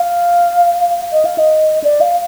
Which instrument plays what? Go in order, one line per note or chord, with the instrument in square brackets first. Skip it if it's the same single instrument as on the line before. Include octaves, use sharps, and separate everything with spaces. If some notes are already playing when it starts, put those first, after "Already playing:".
Already playing: [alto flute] F5
D#5
F5
D#5
D5
F5